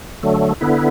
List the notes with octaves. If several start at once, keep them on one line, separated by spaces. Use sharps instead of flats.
D3 F#3 A3
D3 B3 E4